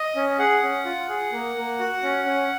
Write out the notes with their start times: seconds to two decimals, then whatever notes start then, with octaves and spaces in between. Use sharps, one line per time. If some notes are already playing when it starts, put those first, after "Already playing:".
Already playing: D#5
0.16 C#4
0.39 G#4 F#5
0.63 C#4
0.85 F4
1.09 G#4
1.32 A#3
1.56 A#3
1.79 F#4
2.03 C#4
2.26 C#4